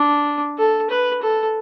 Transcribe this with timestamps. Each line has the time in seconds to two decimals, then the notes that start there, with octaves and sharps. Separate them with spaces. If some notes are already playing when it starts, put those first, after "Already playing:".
Already playing: D4
0.58 A4
0.90 B4
1.22 A4